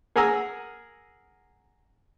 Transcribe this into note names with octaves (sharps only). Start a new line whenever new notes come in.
G#4 A#4 F#5 G#5 A#5 E6